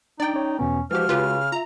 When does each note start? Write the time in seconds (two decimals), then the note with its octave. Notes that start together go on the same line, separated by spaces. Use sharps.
0.20 D4 D#4 D5 G5
0.34 C#4 C#5
0.59 E2 B2 B3 C#4
0.91 E3 F3 G#3 F#4 G4 F6
1.09 C#3 F4 G4 B4
1.52 F4 E5 A#5